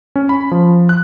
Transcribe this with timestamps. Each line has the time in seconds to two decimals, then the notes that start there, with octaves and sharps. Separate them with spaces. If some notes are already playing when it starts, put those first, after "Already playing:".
0.16 C#4
0.29 B5
0.51 F3
0.89 F#6